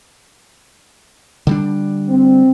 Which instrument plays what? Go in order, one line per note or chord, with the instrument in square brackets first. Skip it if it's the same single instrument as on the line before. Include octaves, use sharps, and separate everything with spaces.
[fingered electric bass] D3 G3 D4
[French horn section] C4